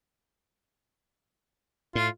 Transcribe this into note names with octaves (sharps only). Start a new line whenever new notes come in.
A2 F4